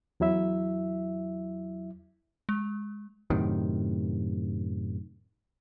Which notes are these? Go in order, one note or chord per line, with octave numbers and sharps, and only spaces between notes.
E2 F#3 E4 E5
G#3
F#2 A2 C3 D#3